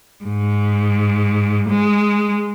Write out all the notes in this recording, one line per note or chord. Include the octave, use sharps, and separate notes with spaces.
G#2
G#3